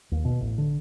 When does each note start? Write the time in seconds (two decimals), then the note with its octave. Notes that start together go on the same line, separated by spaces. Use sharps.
0.12 D#2
0.25 B2
0.41 A1
0.58 D3